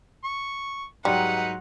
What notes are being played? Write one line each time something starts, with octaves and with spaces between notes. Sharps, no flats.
C#6
G#2 F#3 G3 D#4 B4 F#5 C6